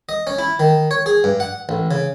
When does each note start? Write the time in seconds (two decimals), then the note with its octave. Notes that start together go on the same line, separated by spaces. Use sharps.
0.09 D#5
0.27 C#4
0.39 E4
0.60 D#3
0.91 C#5
1.06 G#4
1.24 G2
1.40 F#5
1.69 A1
1.91 C#3